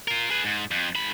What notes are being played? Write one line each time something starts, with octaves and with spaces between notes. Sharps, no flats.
F4 A#4
G#4 B4
G#2
F2
G#2 B5